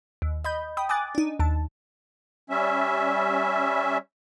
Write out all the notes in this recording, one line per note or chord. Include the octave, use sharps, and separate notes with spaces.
D#2
D#5 B5 G6
G5 B5 D#6
G#5 D6 D#6 F#6 A6
D4 D#4
D#2 A5
G3 C#4 E5